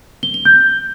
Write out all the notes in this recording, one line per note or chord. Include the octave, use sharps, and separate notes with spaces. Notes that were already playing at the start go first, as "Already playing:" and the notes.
G7
G7
G6